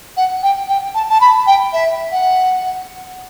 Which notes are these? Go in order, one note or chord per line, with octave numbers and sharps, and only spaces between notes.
F#5
G5
G5
A5
A5
B5
G5
E5
F#5